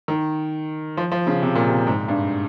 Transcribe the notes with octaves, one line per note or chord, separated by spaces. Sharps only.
D#3
F3
F3
C#3
C3
A#2
C3
G#2
G2